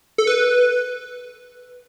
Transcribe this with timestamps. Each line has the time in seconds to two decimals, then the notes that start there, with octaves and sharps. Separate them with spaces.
0.18 A4
0.27 B4